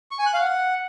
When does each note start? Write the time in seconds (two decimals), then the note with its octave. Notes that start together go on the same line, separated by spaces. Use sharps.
0.11 C#6
0.19 G#5
0.26 F#6
0.34 F5
0.41 F#5